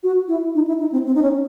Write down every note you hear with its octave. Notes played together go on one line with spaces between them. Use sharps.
F#4
E4
D#4
E4
D#4
C4
C4
D#4
C#4